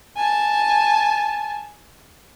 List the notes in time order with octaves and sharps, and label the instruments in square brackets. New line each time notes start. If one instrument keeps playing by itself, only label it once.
[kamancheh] G#5 A5